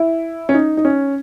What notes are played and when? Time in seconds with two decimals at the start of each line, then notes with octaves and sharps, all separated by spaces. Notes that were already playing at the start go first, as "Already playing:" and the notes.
Already playing: E4
0.49 C#4
0.54 D#4
0.77 D#4
0.85 C#4